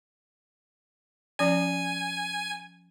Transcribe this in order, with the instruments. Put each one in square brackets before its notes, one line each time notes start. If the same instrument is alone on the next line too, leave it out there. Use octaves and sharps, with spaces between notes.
[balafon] F3 C#4 D5 [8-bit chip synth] G#5